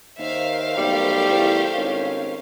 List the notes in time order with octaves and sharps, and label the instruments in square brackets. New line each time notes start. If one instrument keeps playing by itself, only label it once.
[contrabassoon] D#2 [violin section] A#4 C5 F5 [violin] E5
[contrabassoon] B1 [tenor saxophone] G3 [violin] A3 G4
[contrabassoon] E2
[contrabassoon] G#1 [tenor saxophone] C#4